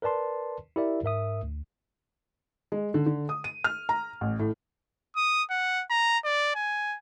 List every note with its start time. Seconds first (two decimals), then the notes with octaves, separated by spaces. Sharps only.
0.02 A#4 B4 D5 A5 C6
0.76 E4 G4 A#4 D5 E5
1.03 G#2 A#4 E5 D#6
1.43 D2
2.72 G#3
2.94 D3
3.06 D3
3.29 D#6
3.44 D#7
3.64 F6
3.89 A#5
4.21 A1
4.39 A2
5.16 D#6
5.51 F#5
5.90 A#5
6.24 D5
6.55 G#5